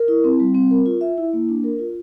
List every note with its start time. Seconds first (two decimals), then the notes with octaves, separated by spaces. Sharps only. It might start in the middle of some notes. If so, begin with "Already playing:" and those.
Already playing: A#4
0.08 E4
0.24 C4
0.40 G3
0.55 C4
0.71 A#4
0.86 F4
1.01 E5
1.18 E4
1.33 A#3
1.49 D4
1.64 A#4
1.79 F4